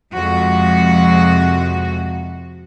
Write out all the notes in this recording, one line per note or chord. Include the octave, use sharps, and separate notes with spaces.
F2 C3 G#3 F#4